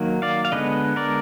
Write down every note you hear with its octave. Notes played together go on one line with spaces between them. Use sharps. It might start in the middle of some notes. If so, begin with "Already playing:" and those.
Already playing: D#3 F#3 A#3
D5 F5
F5
D3 G#3 B3 B4 D#5
A#4 D5